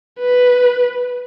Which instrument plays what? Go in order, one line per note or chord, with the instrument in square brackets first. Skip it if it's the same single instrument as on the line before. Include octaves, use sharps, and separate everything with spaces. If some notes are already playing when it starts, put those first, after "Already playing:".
[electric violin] B4